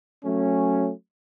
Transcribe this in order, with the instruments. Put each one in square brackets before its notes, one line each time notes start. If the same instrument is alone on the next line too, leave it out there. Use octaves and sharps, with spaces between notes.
[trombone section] F#3 A3 C#4